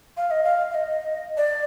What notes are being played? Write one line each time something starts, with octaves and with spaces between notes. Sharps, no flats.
F5
D#5
F5
F5
D#5
D5